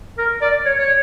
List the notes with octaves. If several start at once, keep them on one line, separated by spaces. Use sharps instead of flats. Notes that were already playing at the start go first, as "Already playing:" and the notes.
A#4
D5
C#5
C#5